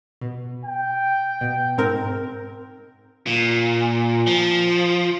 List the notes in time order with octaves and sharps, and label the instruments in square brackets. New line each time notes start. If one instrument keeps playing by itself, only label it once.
[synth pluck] B2
[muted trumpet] G5
[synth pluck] B2
G#2 C4 A#4
[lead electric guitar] A#2
F3